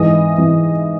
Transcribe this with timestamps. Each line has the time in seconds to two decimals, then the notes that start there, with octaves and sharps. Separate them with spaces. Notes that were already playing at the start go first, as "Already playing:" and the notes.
Already playing: G#2 E3 D#5
0.38 E3